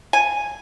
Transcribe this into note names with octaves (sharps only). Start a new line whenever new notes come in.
G#5